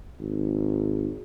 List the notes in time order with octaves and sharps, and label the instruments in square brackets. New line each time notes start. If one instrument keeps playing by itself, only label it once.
[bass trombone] G#1